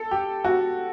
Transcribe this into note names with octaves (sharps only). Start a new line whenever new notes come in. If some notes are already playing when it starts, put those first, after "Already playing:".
Already playing: A4
G4
F#4